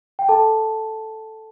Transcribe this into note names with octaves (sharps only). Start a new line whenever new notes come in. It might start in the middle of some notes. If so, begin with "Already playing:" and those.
G5
A4 A5